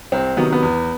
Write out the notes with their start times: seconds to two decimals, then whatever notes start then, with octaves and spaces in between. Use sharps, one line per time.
0.12 C2 C4
0.37 C3 D#3 F#3 B3
0.53 B3
0.63 E2